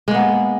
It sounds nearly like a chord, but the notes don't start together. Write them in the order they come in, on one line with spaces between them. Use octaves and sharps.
G#3 A#3 B3